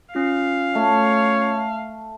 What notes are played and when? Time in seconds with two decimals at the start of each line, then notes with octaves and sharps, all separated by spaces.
0.14 C#4 F4 F5 C7
0.75 A3 C#5